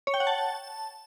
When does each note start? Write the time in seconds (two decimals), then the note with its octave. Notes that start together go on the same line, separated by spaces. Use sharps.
0.07 C#5
0.14 G5
0.20 F#5
0.27 A5